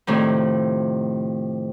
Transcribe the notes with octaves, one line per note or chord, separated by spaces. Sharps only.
A2 C3 D#3 F3